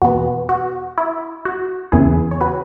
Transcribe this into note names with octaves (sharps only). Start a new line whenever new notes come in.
E2 B2 B3 F#4
F#4
E4
F#4
E2 C#3 E3 B3 E4 G#4
C#5
F#4 B4